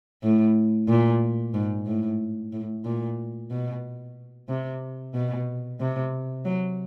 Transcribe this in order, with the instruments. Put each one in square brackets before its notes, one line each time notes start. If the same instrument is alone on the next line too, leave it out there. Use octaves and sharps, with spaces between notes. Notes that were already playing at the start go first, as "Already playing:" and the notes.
[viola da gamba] A2
A#2
G#2
A2
A2
A#2
B2
C3
B2
C3
F#3